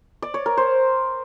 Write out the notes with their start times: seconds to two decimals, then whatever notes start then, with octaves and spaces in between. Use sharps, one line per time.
0.22 D5
0.34 C#5
0.46 A#4
0.57 C5